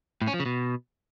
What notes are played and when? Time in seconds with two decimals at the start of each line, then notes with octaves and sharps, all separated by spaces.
0.22 A2
0.28 C#4
0.34 F3
0.40 C#3
0.46 B2